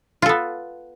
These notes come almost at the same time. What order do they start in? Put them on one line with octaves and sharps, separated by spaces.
F4 A4 B3